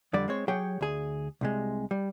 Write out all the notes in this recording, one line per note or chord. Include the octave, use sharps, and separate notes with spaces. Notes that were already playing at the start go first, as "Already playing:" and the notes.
F2 D3 G3 D5
G#3 C4 C#5
F#3 G4 G#4 C#5 F#5 G5
D2 G#4
C2 C3 G#3
G3